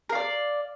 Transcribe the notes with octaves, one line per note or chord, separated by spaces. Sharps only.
A#4 D5 F5